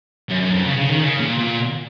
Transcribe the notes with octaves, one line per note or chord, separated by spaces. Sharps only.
F#2
F#2
F2
C#3
C#3
D#3
C#3
A#2
A#2